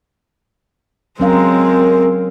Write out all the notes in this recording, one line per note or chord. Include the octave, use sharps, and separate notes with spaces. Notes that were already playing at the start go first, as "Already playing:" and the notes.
F#3 G#3 C4 C#4 A#4 F5